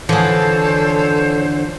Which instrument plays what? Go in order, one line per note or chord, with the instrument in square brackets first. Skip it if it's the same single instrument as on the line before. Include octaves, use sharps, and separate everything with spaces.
[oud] D3 E3 [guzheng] F3 G#4 [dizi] A4 [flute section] C5 C#5